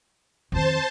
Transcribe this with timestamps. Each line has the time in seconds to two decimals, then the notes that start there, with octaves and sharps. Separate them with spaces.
0.52 F2 D#3 C5 A5